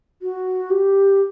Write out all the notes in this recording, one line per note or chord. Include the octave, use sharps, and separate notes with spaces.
F#4
G4